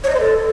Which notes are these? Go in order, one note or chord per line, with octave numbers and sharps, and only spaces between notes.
C#5
D#5
C5
A4